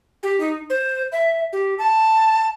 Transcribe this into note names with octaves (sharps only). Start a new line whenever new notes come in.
G4
D#4
C5
E5
G4
A5